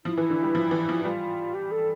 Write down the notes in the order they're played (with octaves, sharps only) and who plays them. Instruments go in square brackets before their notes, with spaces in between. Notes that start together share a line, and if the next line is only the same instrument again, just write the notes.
[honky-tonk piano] F3 [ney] E4
[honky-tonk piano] E3
D3
G3
F3
E3
F3
[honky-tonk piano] G3 [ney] F4
[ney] G4
A4